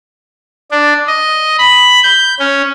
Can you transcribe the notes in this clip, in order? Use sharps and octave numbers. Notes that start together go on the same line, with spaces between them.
D4
D#5
B5
G6
C#4